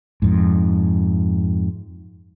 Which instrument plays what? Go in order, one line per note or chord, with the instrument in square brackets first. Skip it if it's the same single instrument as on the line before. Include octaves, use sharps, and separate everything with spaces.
[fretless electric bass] F2 G#2